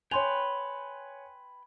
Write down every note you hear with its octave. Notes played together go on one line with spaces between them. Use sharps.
B4 C#5 G5 G#5 C6 F7